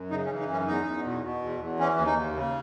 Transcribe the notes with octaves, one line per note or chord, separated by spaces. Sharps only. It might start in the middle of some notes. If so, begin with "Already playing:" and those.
Already playing: F#2
C#3 D#4
C#4
E3
D#4
F#2 C#4
E2 D#4
E2
B2
B2
E2
E2
E3 C#4
D#2
D#4
D#2
C#3